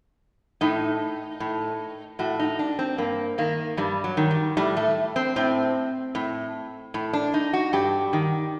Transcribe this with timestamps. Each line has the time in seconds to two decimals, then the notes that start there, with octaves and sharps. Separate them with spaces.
0.61 A2 D#4
1.40 A2
2.19 A2 F#4
2.39 D#4
2.59 D4
2.79 C4
2.98 G2 A#3
3.38 D#3 A#3
3.77 G2 G3
4.04 F#3
4.17 D#3
4.31 G3
4.57 A2 G3
4.77 A3
5.16 C4
5.36 A2 C4
6.15 A2
6.94 A2
7.13 D4
7.34 D#4
7.53 F#4
7.73 G2 G4
8.13 D#3